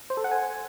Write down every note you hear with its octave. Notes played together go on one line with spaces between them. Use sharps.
C5
A4
F#5
G#5